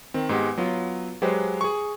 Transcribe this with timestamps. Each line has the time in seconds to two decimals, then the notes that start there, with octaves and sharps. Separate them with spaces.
0.14 D#3 C4
0.29 G#2 G#3 B3 G4
0.58 F#3 B3 F4
1.22 F#3 G#3 G4 B4 C5
1.61 G#4 C#6